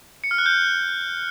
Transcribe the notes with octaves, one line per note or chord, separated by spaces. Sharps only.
C#7
F6
F#6
G6